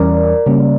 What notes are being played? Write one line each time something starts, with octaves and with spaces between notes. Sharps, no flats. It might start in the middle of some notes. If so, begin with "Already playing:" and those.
Already playing: E2 E3 G3 C#4 A#4 D5
C#3 G3 A#3 C#4